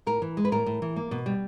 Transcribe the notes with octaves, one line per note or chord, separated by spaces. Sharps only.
A2 A#4
E3
G#3
B4
A2 A#4
A2
E3
A#3
B2
G3